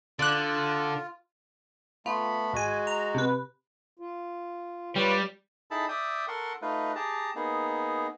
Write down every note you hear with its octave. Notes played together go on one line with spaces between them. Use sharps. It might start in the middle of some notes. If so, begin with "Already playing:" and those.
D3 F4 D5 F#6
A3 B3 F4 B5
G#1 G#3 F#4 G#5
A#5
C3 B4
F4
G3 F4 B4 C#5
D#4 E4 G#4 A4 A5 B5
D5 E5 G5 D#6
A4 A#4 F#5 C6 C#6
A3 D#4 F4 B4
G4 G#4 A5 A#5
A#3 B3 D#4 G#4